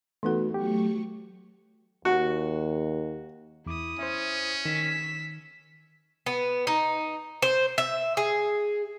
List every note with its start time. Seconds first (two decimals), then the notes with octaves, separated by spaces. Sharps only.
0.23 E3 A3 B3 D#4 F#4 A4
0.54 F#3 A3 G4 C#6
2.05 D#2 F#4
3.66 E2 E4 D6 D#6
3.99 C#4 C5 E5
4.65 D#3 E6 B6
6.26 B3
6.67 D#4
7.42 C5
7.78 E5
8.17 G#4